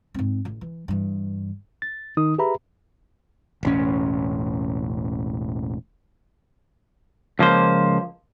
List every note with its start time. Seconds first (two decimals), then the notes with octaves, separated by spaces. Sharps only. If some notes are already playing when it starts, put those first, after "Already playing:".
0.14 G#2 C4
0.45 A1
0.61 E3
0.88 G2 E3
1.82 A6
2.17 D#3 D#4 D#6
2.38 G4 G#4 B4 E5 A#5 B5
3.63 E1 A1 C#4
7.39 C#2 F3 A#3 C5